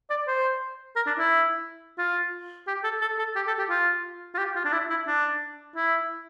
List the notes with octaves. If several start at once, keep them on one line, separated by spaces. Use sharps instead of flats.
D5
C5
A#4
D4
E4
F4
G4
A4
A4
A4
G4
A4
G4
F4
F4
G4
F4
D4
E4
E4
D4
E4